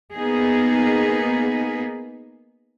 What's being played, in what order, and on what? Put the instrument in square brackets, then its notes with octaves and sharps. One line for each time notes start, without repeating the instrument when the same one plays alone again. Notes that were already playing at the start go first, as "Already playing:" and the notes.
[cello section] A#3 B3 D#4 G#4